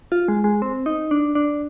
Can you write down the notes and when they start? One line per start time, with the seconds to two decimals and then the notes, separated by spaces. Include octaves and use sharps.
0.12 F4
0.28 G#3
0.44 G#3
0.62 C4
0.86 D#4
1.11 D4
1.35 D4